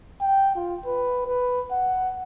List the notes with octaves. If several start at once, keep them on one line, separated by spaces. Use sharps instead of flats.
G5
F4
B4
B4
F#5